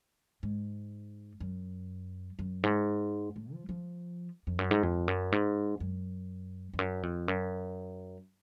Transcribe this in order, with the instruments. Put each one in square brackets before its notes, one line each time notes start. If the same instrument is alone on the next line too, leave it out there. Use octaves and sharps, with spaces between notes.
[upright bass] G#2
F#2
F#2
G#2
A2
F3
F3
F2
F#2
G#2
F2
F#2
G#2
F#2
F2
F#2
F2
F#2